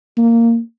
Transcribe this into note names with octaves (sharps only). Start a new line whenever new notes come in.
A#3